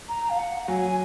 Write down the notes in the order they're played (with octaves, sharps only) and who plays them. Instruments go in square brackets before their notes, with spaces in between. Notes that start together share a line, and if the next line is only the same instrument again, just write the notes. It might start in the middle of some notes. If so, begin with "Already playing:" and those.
[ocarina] A#5
F5
F#5
[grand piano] F#3 [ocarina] G#5